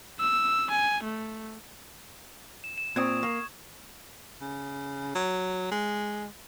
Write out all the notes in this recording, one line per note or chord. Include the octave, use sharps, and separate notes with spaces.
E6
G#5
A3
E7
E7
A#2 C4 C#6 D#6 G#6
A#3 C#6
C#3
F#3
G#3